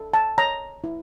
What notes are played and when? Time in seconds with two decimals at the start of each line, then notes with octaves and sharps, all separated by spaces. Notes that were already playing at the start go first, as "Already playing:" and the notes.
Already playing: A4
0.14 A5
0.38 C#5 A#5
0.84 E4